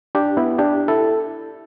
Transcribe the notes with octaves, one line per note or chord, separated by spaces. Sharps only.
D4 G4
B3 E4
D4 G4
E4 A4